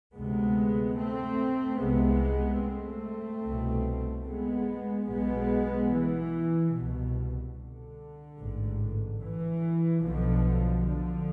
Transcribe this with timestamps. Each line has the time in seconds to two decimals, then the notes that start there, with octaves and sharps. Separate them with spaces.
0.14 D2 C3 G#3 B3
0.97 A3 C4
1.79 C2 C3 G#3 B3
2.62 A3 C4
3.44 C2 B2
4.26 G#3 B3
5.09 B1 B2 G#3 B3
5.92 E3
6.74 C2 B2
7.56 D3
8.38 A1 G#2
9.21 E3
10.03 B1 B2 D3 F3
10.85 D3 F3